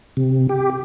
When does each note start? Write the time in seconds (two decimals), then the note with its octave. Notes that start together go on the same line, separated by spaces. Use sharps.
0.17 C3
0.49 G4